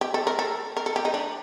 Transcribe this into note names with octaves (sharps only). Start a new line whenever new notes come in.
G4
A4
A#4
A4
A#4
A4
G4
D#4
D4